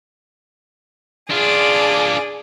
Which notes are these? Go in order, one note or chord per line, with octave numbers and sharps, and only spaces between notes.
D4 F4 G#4 D5